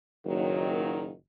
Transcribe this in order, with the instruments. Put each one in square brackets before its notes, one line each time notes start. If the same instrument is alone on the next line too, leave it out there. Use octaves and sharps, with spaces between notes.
[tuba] F#1 [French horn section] A#2 D#3 F#3